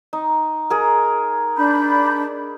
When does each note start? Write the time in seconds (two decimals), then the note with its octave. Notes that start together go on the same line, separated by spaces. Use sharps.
0.13 D#4
0.70 G#4 A#4
1.57 D4 B5 G6